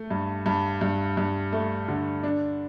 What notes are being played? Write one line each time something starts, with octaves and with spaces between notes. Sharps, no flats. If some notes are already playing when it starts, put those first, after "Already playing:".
Already playing: A3
G2
G2
G2
G2
A3
D3
D4